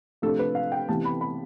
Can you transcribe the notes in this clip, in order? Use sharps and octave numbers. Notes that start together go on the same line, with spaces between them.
C3 F3 A3 D4 A4
B4
F5
G5
C3 E3 B3 A5
B5
B5